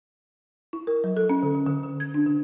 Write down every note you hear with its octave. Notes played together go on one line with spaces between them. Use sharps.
E4
A#4
F#3
A4
C#4
D3
D3
D3
D3
G#6
D4
D3